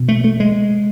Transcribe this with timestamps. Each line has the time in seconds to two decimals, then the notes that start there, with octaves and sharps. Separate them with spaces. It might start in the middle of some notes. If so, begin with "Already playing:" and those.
Already playing: B2
0.08 A3
0.24 A3
0.40 G#3